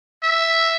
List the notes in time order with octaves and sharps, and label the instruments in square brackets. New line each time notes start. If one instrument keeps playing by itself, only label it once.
[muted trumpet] E5